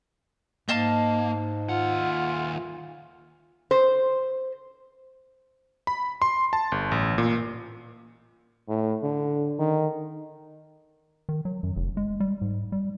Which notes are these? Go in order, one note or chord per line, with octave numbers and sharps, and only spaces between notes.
G#2 A#3 D#5 F5 A5
D#2 F4 F#5
C5
B5
C6
A5
G1
A1
A#2
A2
D3
D#3
D#3
F#3
F#2
F1
G#3
G3
G#2
G3